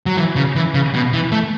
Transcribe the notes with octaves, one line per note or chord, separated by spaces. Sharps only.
F#3
E3
C#3
E3
C#3
B2
E3
A3